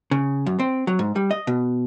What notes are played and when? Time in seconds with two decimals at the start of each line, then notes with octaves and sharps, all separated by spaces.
0.11 C#3
0.46 F#2
0.59 C4
0.87 F#3
0.99 G#2
1.16 G3
1.31 D#5
1.47 B2